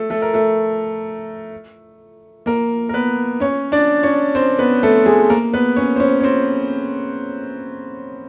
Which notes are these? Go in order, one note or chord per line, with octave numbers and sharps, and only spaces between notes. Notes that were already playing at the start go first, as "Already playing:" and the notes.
Already playing: A3 A4
A3 A4
A#4
A3 A4
A#3 A#4
A#4
B3 B4
C#4 C#5
D4 D5
C#4 C#5
C4 C5
B3 B4
A3 A4
G#3 G#4
A#3 A#4
B3 B4
C#4 C#5
C5
C#4 C#5
C#5
C4 C5